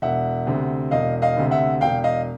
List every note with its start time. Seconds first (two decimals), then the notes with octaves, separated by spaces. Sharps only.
0.02 E1 E5 F#5
0.47 D2 C3
0.91 E1 D#5 F5
1.22 D#5 F5
1.37 D2 C3
1.51 E5 F#5
1.81 E1 F5 G5
2.04 D#5 F5